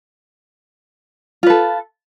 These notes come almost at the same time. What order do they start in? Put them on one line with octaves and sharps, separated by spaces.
F4 B4 A4